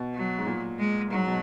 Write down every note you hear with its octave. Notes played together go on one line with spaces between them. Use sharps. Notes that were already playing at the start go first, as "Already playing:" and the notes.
Already playing: B2
F#3
G#2
A#2
G#3
G#2 F#3
B2